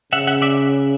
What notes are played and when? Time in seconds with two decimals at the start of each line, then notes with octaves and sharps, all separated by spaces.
0.13 C#3 E5 F#5
0.27 E5 F#5
0.42 D5 E5